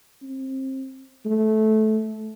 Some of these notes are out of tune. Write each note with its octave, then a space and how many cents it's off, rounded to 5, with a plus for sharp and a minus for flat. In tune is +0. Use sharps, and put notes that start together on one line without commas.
C4 +25
A3 -15